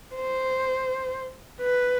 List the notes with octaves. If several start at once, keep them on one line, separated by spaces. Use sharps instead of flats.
C5
B4